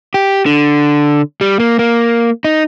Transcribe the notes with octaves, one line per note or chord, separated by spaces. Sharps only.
G4
D3
G3
A#3
A#3
D#4